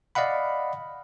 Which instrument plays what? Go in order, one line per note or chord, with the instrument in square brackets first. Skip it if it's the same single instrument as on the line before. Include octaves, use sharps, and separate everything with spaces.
[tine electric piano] D5 D#5 F5 F#5 B5